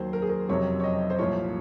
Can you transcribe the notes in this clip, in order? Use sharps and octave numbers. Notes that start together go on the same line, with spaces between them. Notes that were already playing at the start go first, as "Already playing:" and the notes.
Already playing: D#2 D#3 F#3 C5
A#4
G#4
A#4
F#1 F2 C3 F#3 C#5
C#5
D#5
C5
C2 A#2 F3 C#5